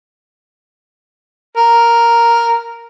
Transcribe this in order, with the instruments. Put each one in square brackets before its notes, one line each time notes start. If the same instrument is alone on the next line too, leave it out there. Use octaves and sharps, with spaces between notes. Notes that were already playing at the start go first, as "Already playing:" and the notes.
[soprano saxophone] A#4